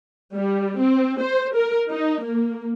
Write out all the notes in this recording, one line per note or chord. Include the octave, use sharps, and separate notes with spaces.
G3
C4
C5
A#4
D#4
A#3